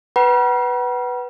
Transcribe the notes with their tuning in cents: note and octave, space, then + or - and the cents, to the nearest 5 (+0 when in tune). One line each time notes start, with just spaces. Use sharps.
B4 +0 F#5 +40 B5 -40